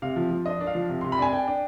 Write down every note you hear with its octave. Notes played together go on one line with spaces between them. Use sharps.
C3 F5
F3
F3
D4 D#5
D4
F5
F3
C3
C3 C6
B5
D4 G#5
D4 G5
D4